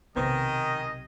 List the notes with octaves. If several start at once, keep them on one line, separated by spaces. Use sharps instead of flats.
B1 C3 D#3 B3 G#4 B4 C5 D#5